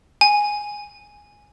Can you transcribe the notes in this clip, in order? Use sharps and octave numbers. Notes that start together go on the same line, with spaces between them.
G#5